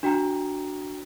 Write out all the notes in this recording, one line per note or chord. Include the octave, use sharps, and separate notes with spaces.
D4 F#4 G5 A#5